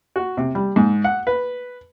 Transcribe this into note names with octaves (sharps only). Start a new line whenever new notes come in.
F#4
C3
G3
G#2
F#5
B4